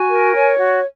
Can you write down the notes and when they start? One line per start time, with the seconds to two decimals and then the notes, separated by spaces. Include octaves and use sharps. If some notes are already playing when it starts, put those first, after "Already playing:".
Already playing: F#4 G#5
0.10 A#4
0.35 C#5
0.59 F#4